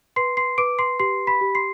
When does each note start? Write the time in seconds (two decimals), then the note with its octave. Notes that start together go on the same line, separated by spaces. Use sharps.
0.16 B4 C6 C7
0.37 C6 C7
0.58 B4 D6 D7
0.79 C6 C7
1.00 G4 C6 C7
1.27 B5 B6
1.41 G4
1.55 C6 C7